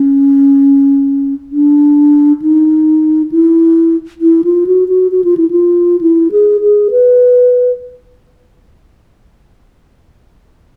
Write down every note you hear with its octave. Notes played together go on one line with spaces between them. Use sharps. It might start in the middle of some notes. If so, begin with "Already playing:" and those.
Already playing: C#4
D4
D#4
E4
E4
F4
F#4
F#4
F#4
F4
E4
F4
E4
G#4
G#4
B4